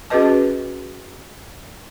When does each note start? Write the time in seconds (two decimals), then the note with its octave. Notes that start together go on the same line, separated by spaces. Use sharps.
0.10 C#4 F#4 G#4 B4 D#5 A5